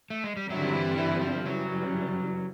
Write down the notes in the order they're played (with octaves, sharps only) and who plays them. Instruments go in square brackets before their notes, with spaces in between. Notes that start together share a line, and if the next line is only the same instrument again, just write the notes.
[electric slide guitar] A3
G#3
G3
[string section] G2 D3 G3 C4 E4 [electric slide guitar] F#3
[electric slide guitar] D#3
E3
E3
F3
[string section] F#2 C#3 E3 G3 [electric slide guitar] F#3